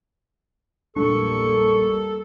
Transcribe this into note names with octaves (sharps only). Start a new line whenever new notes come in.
A#1 E2 G3 G#3 A#3 D4 A4 C#6